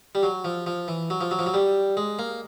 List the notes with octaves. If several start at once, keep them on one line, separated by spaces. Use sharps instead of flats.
G3
F#3
F3
F3
E3
F#3
F3
F#3
F3
F#3
G3
G#3
A#3